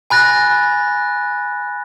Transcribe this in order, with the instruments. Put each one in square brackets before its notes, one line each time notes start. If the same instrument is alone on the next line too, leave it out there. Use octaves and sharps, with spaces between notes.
[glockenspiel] G#5 B5 F#6 A6 A#6